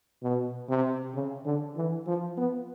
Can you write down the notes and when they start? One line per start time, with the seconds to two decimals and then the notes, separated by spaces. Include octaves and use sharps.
0.22 B2
0.68 C3
1.14 C#3
1.45 D3
1.76 E3
2.06 F3
2.37 B3